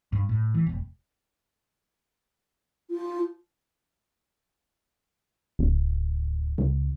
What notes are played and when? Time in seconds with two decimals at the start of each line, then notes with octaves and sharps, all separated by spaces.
0.13 G2
0.29 A2
0.54 E3
0.67 E1
2.91 F4
5.59 D1
6.58 C#2